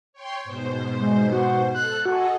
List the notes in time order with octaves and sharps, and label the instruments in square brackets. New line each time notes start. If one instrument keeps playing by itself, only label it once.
[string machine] C#5 G5 C6
G#2 B2 C5
[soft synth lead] G#3
F#4
[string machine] A4 [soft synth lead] F#6
[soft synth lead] F#4 [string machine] G#4 A4 D#5